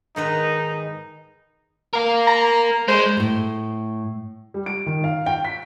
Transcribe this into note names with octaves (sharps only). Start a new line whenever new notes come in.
G#2 D#3 D#4 B4
A#4 F5
A#5
G#3 C5
A2 A3
G3
D7
D#3
F5
G5
B6